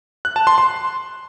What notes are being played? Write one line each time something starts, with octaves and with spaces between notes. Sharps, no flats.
F#6
A5
C6
C6